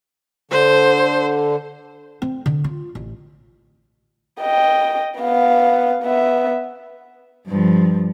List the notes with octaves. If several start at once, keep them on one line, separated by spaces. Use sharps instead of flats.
D3 C5
C4
D3
F4
A1
D#5 G5
B3 F5
B3 E5
G2 F3